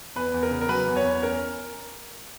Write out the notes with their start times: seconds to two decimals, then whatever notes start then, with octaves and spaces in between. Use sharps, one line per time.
0.15 E2 B4
0.34 E2
0.43 A#4
0.51 C#3
0.61 A#4
0.69 F#3 B4
0.87 E2
0.96 C#5
1.04 E2
1.22 C#4 A#4